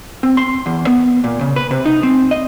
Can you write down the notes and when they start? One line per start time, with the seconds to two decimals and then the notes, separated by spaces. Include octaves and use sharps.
0.23 C4
0.37 C6
0.66 E2
0.87 B3
1.24 A#2
1.41 C#3
1.56 B4
1.71 C3
1.86 D#4
2.03 C4
2.31 D#5